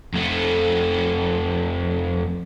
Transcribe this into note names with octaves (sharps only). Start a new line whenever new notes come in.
F2 A3